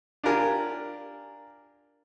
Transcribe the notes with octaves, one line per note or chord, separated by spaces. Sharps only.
D4 F4 G4 A#4 G#5